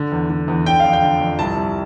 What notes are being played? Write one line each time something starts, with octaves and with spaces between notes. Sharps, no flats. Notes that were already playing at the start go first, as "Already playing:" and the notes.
Already playing: D3
E2
D3
E2
D3 G5
F2 F5
G5
D3
F2
C2 A5
C2